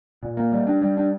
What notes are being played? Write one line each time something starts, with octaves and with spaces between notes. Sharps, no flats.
A#2
A#3
G3
D4
G3
D4